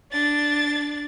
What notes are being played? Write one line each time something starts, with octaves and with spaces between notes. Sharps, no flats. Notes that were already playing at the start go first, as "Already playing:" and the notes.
D4 A6